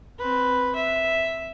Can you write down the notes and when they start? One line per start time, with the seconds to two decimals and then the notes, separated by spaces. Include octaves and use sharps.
0.18 C4 B4
0.75 E5